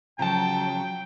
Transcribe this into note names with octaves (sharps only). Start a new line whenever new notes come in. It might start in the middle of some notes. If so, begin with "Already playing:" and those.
C#3 F3 F#3 G5 A5 A#5